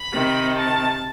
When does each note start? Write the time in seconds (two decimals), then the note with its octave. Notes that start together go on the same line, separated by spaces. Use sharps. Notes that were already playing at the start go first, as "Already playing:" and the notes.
Already playing: B5
0.12 C3 D#3
0.55 A5